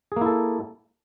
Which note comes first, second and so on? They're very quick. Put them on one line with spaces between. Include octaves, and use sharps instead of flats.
G#4 A#3 E4 A4